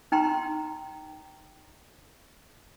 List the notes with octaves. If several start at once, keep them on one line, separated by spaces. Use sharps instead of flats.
D#4 G5 A#5 C6